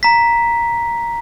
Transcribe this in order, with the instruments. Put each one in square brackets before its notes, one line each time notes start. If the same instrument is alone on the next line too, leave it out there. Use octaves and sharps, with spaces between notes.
[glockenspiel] A#5 B6